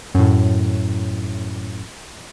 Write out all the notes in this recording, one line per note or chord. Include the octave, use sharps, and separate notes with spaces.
F#2 A2